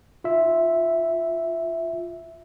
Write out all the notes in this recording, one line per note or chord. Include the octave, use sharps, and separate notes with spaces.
F4 E5